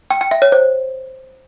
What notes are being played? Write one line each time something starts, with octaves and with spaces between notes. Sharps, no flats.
G5
G5
E5
C#5
C5